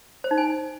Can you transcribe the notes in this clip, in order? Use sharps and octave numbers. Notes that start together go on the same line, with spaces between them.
C5
D#4
G#5